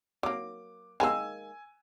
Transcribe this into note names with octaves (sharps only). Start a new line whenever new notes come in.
F#3 A#3 D6
D#3 G#3 A#3 G#5 E6